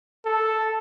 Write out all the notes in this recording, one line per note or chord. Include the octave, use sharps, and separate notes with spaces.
A4